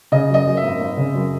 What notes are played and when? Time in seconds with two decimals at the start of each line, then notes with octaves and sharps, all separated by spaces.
0.12 C#3 D#5
0.29 F#2 D#5
0.46 F#2
0.57 E5
0.63 G#1
0.80 G#1
0.97 C#3
1.14 F#2